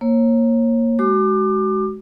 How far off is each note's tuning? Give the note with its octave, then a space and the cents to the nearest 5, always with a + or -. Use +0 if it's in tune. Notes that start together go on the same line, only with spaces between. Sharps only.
A#3 +0 C#5 -35
G#3 +15 F#4 +35 D6 +25